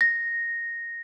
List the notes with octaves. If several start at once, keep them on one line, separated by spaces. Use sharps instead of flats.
A#6